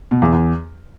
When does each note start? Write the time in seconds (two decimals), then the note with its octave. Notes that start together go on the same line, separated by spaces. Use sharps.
0.11 B2
0.22 E2
0.33 E2